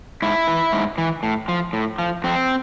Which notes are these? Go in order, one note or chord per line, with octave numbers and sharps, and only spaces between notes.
G#2 E4
E3
G#2
E3
A2
F3
A2
F3
F2 C4